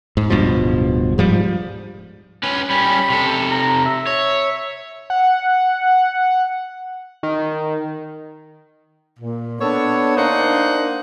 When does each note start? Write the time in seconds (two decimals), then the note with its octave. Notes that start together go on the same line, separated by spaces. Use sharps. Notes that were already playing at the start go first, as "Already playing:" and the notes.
0.17 G#2
0.30 D1 G2 B2 F3
1.18 G#2 F3 G3
2.43 C#4 B4
2.70 G3 C#4 B5
3.10 C3 A4
3.51 A#5
3.86 E5
4.07 C#5
5.10 F#5
7.23 D#3
9.19 A#2
9.60 B3 D4 A4 C#5
10.17 A#3 D4 D#4 C5 F#5